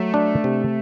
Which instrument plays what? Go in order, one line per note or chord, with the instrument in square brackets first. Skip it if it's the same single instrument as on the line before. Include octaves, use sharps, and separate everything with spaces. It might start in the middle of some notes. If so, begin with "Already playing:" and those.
Already playing: [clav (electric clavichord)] F#3 [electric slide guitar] A3
[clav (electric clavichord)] D4
C3